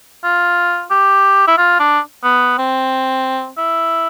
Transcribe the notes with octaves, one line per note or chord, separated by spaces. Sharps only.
F4
G4
E4
F4
D4
B3
C4
E4